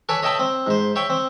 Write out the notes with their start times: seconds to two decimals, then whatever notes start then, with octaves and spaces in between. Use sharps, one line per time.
0.09 A4 B4 C#5 D5 G#5
0.22 C#5 D#5 E5 G5 A5 B5
0.39 C4
0.67 G#2 C5
0.96 C#5 E5 G5 C#6
1.10 C4